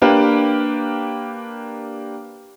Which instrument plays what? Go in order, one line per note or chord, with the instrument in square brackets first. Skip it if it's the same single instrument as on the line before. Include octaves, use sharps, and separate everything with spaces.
[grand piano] A#3 D4 G4 A#4 B4